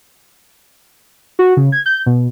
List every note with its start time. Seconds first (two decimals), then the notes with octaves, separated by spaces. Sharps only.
1.39 F#4
1.57 C#3
1.72 G#6
1.86 G6
2.06 B2